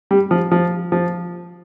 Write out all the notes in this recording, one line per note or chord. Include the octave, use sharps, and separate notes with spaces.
G3
F3
F3
F3